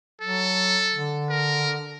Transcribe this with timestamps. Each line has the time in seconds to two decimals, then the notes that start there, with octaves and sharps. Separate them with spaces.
0.22 F#3 A4
0.94 D3
1.30 A#4